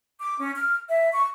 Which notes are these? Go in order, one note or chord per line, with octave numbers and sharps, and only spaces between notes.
D6
C#4
F6
E5
C#6